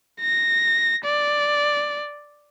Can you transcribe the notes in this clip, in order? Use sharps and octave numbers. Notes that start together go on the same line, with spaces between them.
A#6
D5